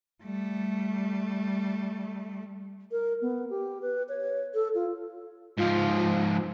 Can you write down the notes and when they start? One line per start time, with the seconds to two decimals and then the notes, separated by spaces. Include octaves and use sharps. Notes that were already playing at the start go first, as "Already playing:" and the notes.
0.24 G3 A3
2.91 A#4
3.22 B3
3.50 G4
3.82 B4
4.09 C#5
4.54 A4
4.75 F4
5.58 G#2 F3 F4